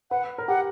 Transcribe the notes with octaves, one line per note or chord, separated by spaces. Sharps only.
B4 F#5
A#4
G4 F#5